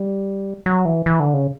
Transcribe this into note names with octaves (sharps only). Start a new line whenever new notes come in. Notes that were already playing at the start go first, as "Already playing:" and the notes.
Already playing: G3
F#3
E3
E3
D3
C#3